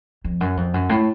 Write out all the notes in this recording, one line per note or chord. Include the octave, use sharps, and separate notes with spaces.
F2
F#2
F2
F#2
A2